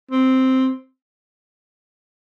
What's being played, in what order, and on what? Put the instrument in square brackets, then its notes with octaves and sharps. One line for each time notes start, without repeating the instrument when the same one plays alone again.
[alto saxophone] C4